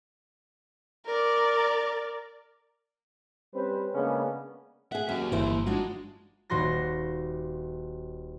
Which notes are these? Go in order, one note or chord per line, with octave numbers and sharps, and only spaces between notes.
A#4 D5
G3 C4 C#4 B4 C5
C#3 G#3 A#3 B3 C#4 D4
G#4 E5 F#5
F#2 A#3 G4
G1 E3 E4 C5
G#3 D4 D#4 F4 F#4
D#1 F#4 C6 A#6